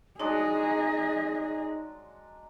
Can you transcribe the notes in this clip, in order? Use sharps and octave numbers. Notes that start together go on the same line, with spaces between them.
F#3 G#3 D4 D#4 G#4 D#5